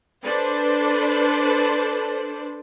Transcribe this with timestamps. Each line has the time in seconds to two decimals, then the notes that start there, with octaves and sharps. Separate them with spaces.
0.24 D4 A4 B4 C5 D5